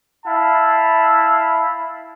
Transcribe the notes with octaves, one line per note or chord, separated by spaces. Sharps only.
E4 F5 A5